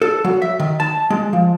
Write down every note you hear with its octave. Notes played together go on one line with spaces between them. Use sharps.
A4
F#3
E5
D#3
A5
G#3
F3